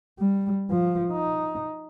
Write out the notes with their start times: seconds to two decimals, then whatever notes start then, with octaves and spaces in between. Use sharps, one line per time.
0.19 G3
0.71 F3
1.12 D#4